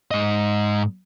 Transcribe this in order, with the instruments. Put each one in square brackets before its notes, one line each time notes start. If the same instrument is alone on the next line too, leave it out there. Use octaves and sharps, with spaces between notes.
[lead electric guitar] G#2 D#5